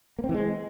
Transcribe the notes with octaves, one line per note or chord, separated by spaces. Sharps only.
A#3
C4
E3
G#3